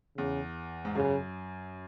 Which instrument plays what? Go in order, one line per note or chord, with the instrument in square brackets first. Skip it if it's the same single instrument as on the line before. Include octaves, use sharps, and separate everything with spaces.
[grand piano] E2 [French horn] C#3
[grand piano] G#2
[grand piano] F#2 [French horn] C#3